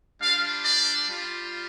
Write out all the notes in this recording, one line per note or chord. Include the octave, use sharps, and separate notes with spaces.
G3 D4 F4 F5
D5
G3 F4